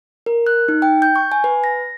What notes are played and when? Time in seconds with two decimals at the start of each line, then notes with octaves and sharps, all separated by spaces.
0.26 A#4
0.47 F#6
0.68 D#4
0.82 G5
1.02 G6
1.16 C#6
1.32 G#5
1.44 B4
1.64 A#6